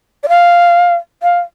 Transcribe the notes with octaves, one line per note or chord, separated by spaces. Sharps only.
D5
F5
F5